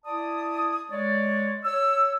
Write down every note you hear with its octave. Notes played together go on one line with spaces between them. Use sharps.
E4 D5 A5 D#6
G#3 C#5 D5
C#5 E6